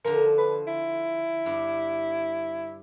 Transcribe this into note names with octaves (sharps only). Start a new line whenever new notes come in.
D3 F3 A#4
B4
E4
G2